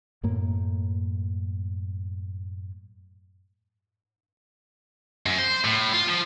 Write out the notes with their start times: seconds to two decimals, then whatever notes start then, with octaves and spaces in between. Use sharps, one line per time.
0.23 F#2 A2 A#3
5.26 F#2
5.38 C5
5.65 A2
5.93 F4
6.08 F3